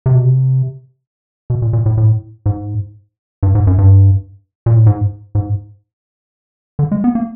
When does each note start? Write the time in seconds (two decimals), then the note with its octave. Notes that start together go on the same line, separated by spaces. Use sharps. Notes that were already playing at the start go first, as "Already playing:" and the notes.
0.06 C3
0.15 B2
0.25 C3
1.50 B2
1.62 A#2
1.73 A#2
1.86 A2
1.97 A2
2.46 G#2
3.43 G2
3.55 G#2
3.67 F#2
3.78 G2
4.66 A#2
4.77 A2
4.86 G#2
5.35 G#2
6.79 D3
6.92 G#3
7.04 B3
7.15 A#3